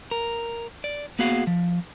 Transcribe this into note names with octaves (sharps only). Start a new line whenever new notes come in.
A#4
D5
A#3 B3 F#4 G#4 F5 F#5
F3